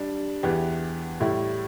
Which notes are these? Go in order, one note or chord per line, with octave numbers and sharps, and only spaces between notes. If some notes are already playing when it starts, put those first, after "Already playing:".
Already playing: G3 D4
E2 E3 B3 G4
A2 G3 E4